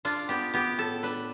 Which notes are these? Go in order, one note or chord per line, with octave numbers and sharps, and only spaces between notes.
D4 F4
B3 G4
B3 G4
A2 A4
D4 B4